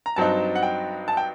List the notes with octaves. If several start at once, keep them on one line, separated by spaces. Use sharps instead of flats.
A#5
G2 F#3 C4 D#4 A5
F#5
G5
A5
G5